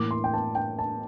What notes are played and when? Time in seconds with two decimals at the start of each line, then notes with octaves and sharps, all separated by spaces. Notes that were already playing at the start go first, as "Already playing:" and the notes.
Already playing: A2 E3 A#3 D6
0.11 C6
0.24 G5
0.34 A5
0.55 G5
0.79 A5